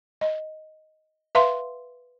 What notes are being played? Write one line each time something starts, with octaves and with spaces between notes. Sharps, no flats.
D#5
B4 E5 F5 C6